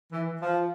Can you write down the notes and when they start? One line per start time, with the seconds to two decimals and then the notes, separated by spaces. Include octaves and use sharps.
0.11 E3
0.40 F3